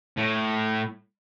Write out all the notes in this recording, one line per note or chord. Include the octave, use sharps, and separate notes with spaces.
A2